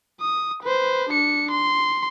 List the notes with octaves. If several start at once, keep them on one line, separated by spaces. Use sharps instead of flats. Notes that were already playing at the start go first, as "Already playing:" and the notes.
D#6
B4 C5
D4 C#7
C6